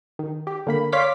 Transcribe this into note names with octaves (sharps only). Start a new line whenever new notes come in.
D#3
G4
D3 A#3 B5
C#5 D5 F5 C6 D6 B6